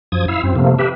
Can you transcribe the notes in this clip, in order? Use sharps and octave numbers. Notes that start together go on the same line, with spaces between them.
F#2 F3 D#6 G#6
E4 F5 E6
F#2 C4
C3 F3 A3 A#3
G4 B4 E5